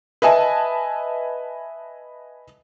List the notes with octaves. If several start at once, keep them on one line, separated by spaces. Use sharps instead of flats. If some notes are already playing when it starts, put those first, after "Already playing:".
B4 D#5 E5 G#5 A5